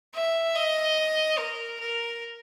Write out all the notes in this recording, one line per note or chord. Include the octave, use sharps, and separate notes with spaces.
E5
D#5
A#4
A#4